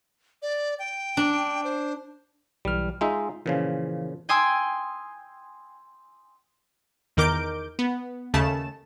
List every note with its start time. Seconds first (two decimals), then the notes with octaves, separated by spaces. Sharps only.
0.42 D5
0.79 G5
1.17 D4
1.64 C5
2.65 B1 E3 G3 F6
3.01 G#3 D#4 F4 E5
3.46 A#2 C#3 E3 F3
4.29 G5 G#5 C6 D#6 E6
7.17 E2 D#3 A#4 D6 G6 D7
7.79 B3
8.34 D#2 C#3 A3 A5 E7